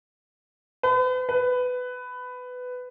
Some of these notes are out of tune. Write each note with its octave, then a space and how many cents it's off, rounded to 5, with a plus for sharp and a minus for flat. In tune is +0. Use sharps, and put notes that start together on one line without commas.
B4 +40
B4 +15